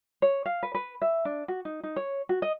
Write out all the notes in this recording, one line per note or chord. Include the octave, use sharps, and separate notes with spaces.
C#5
F5
B4
B4
E5
D4
F#4
D#4
D#4
C#5
F#4
D#5